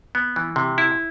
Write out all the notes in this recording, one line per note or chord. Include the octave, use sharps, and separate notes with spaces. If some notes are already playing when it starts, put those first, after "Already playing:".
B3
E3
C3
E4